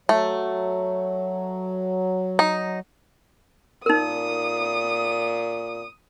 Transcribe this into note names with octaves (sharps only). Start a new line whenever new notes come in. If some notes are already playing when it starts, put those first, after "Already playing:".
F#3 A3
D#4
A#2 D#4 A#4 D#6